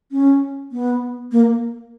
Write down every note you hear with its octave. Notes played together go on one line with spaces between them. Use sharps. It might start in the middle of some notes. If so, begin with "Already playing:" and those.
C#4
B3
A#3